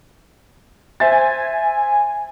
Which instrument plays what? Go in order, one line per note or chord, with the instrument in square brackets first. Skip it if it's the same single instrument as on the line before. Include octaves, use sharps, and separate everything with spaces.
[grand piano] C5 E5 A6 [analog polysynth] G#5